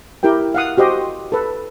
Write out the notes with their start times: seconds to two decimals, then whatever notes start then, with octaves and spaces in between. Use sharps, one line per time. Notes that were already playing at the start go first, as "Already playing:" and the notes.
0.23 E4 G4 A#4 G5
0.54 F5 F#5 D#6
0.77 F#4 G4 C5 D#5 C6
1.32 A4 B4